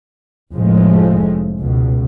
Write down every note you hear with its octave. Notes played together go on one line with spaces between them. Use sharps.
F1 A2 F3 G#3 A3
C#2 B2